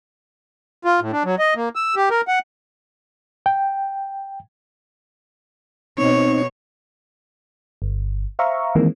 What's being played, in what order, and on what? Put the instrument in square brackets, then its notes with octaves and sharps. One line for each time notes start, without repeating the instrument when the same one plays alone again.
[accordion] F4
A2
D4
F#3
D#5
A#3
E6
G4
A#4
F#5
[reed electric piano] G5
[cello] B2 C#5 [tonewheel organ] C4 D#4
[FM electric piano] G1
C5 E5 F5 A#5 C#6
D#3 E3 G#3 A#3 C4